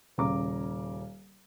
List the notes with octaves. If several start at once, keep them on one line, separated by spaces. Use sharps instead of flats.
D#1 C#3 A#5 D6